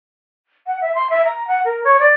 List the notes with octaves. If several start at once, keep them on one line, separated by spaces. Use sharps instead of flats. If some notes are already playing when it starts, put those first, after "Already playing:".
F#5
E5
C6
E5
A#5
F#5
A#4
C#5
D5